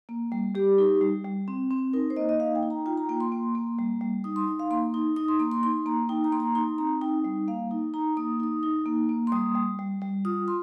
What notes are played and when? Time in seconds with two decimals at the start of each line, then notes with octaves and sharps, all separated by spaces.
0.09 A#3
0.32 G3
0.55 G3 G4
0.78 D#4
1.01 G3
1.25 G3
1.48 C4
1.71 C4
1.93 D#4 A#4
2.10 C5
2.16 A#3 D#5
2.29 D#5
2.40 D#4 F5
2.55 G5
2.63 D#4
2.70 A#5
2.86 F4 G5
2.97 A#5
3.09 A#3 G5
3.20 C6
3.32 A#3
3.55 A#3
3.79 G3
4.01 G3
4.24 D#4 D#6
4.36 C6
4.47 D#4
4.59 F5
4.71 A#3 C6
4.94 D#4
5.16 D#4 D#6
5.28 C6
5.39 A#3 C6
5.51 C6
5.63 D#4 C6
5.86 A#3 A#5
6.09 D#4 G5
6.24 A#5
6.32 A#3 C6
6.40 A#5
6.55 D#4 C6
6.78 C4 A#5
7.01 D#4 G5
7.25 G3
7.48 A#3 F5
7.71 D#4
7.94 D#4 A#5
8.17 A#3 D#6
8.40 D#4 D#6
8.63 D#4
8.86 A#3
9.09 A#3
9.27 C6
9.32 G3 D#6
9.55 G3
9.79 G3
10.02 G3
10.25 F4 D#6
10.47 F4 C6